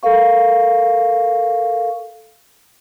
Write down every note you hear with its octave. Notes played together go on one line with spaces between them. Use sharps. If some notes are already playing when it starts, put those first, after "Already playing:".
A4 A#4 F5 C#6